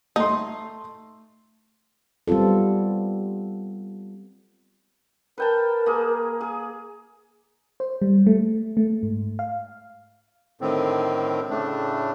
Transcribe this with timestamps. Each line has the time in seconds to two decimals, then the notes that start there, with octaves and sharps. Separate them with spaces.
0.16 A3 D#4 C6
2.28 G3 B3 C4 F4 A4
5.38 A#4 B4 G5 A5
5.86 A#3 G#4
6.41 G#4
7.80 C5
8.02 G3
8.27 A3
8.77 A3
9.03 G#2
9.39 F5
10.61 A2 D3 D#3 C4
11.50 A2 C#3 A3 D4